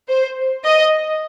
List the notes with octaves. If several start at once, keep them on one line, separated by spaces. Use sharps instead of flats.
C5
D#5